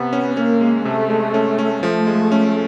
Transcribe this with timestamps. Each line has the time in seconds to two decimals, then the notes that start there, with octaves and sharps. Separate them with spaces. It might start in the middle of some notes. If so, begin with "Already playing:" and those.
Already playing: C3 B3
0.13 C#4
0.37 A#3 C#4
0.61 G#3
0.85 C3 A3
1.10 G#3
1.34 C#4
1.59 C#4
1.83 F3 A3
2.07 G#3
2.32 C#4